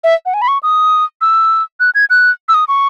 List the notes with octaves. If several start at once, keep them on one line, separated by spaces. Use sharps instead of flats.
E5
F#5
G#5
B5
C#6
D#6
E6
F#6
G#6
F#6
E6
D#6
C#6